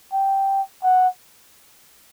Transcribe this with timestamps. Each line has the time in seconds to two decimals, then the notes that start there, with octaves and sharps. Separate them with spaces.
0.13 G5
0.83 F#5